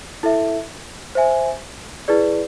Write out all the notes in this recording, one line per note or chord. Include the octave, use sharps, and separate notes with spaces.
E4 A4 E5
C5 E5 G#5
E4 G#4 B4 D5